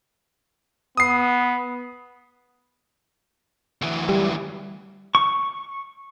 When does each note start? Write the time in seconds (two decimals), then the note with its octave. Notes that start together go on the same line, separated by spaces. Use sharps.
0.97 B3 D#6 C7
3.82 D2 E3
4.09 G3
5.15 C#6